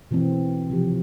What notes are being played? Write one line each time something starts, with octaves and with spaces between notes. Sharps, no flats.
B2 E3 A3 C4
C3 F3 G4